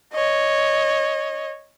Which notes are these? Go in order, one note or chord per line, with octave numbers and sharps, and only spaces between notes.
C#5 D#5